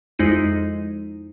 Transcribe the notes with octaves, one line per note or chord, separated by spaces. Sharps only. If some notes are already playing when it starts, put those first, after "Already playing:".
F2 G#3 D#4 E4 C7 D#7